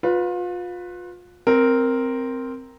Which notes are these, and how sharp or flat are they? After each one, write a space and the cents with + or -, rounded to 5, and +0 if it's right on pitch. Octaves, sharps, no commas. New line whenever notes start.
F4 +30 B4 +0
C4 +0 A#4 +0